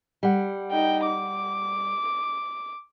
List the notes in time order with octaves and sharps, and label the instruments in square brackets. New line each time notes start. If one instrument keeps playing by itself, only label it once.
[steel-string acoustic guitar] G3 F#5
[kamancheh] D#4 G5
D6